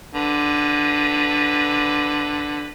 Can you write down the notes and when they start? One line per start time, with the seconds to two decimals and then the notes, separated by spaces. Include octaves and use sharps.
0.15 D3 B4